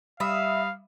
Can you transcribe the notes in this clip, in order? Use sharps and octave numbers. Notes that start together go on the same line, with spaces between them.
G3 E5 F5 B5 D#6